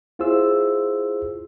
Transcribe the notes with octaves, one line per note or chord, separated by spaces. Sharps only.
E4 F4 G#4 C5 E6